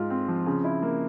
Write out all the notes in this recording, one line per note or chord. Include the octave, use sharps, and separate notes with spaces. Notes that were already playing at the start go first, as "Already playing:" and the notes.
Already playing: G#2 F4
C4
F3
C#3
E4
A#3